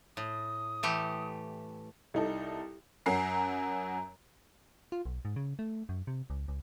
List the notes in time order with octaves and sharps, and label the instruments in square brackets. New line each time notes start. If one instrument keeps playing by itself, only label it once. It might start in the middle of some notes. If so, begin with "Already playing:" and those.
[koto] A2 [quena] D#6
[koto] E3 A3 G4
[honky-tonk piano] C2 D#4 A4
F#2 F#3 A#4 A#5 C7
[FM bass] F4
B1
G#2
C#3
A3
F#2
C3
C#2
C#2